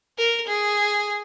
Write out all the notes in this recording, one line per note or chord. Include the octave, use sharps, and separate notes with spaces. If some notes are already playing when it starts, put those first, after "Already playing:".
A#4
G#4